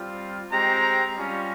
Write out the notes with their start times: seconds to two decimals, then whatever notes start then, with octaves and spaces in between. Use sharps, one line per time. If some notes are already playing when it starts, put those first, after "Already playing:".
Already playing: G3 C4 F4
0.52 G#3 C4 G4 A#5
1.15 G3 C#4 F4